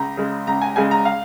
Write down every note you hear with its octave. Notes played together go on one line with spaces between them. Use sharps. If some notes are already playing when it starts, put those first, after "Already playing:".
Already playing: C#2 A#5
C#3 G#3
C#2 A#5
G#5
C#3 G#3 G#5
A#5
F5